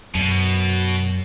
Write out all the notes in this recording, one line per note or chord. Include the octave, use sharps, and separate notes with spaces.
F#2 B2